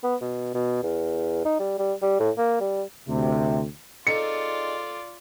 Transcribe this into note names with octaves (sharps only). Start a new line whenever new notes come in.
B3
B2
B2
E2
D#4
G3
G3
G3
A2
A#3
G3
D2 C3
C4 D#4 F4 G#4 A4 D5 C#7